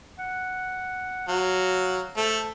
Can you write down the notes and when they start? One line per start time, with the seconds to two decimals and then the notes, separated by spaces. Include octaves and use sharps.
0.19 F#5
1.28 F#3 F5
2.17 A3 C5